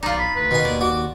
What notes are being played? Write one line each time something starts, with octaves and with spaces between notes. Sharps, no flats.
B1 D#4 F4 D5
B5
D2 B4
B2 D#3 G#5
D#2 D5
F#4 D6